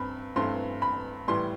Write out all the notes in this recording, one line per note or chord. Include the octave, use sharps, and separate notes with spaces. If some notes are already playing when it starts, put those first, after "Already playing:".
Already playing: G2 C4 B5
G2 E3 A3 C4 C6
B5
A2 E3 G3 C6